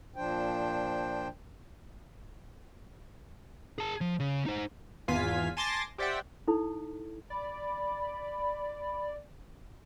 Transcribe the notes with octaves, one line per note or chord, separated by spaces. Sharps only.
A#2 F3 D4 C5 G5
G#4 A5
F3
C#3
D#4 C5
G#1 E2 F4 F5 G#5 B6
G#5 A5 C6 D6 A6 A#6
G4 C5 D5 E5 F#5 G5
D#4 E4 A4
D5 B5